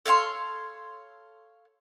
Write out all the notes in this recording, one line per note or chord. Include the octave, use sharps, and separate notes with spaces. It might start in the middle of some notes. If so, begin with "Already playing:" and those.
A4 C#5 F5 C6